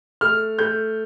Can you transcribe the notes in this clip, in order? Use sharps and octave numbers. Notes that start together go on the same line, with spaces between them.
A3 F6
A3 G6